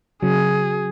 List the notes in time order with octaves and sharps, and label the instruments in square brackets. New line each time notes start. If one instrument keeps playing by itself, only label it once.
[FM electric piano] C#3 F#3 [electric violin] G#4